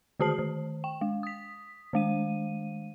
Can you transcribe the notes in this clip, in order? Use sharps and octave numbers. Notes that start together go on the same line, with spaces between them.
D3 D#3 F#4 G#4 A5 C7
D#3
G5
G#3
D#6 B6
D#3 G#3 D#7